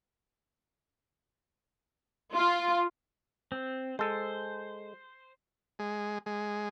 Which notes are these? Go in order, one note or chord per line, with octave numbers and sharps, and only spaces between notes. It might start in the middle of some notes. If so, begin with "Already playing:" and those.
F4
C4
G#3 A4 C5
G#3
G#3